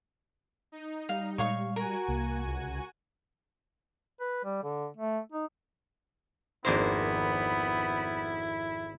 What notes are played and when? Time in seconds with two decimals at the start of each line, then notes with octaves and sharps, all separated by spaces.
0.72 D#4
1.09 G3 F5
1.38 A#2 G#3 C#5 F5 C#6
1.76 F#4 A#4 G#5
2.08 C2 A#3
2.46 C#2
4.20 B4
4.44 G3
4.63 D3
4.96 A3
5.32 D#4
6.65 G#1 F2 A#3 B3 D4 E4 A#4 C5